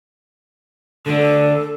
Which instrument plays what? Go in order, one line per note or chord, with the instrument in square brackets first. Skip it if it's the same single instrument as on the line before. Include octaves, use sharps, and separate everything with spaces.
[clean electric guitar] D3 A3 D4 [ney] A4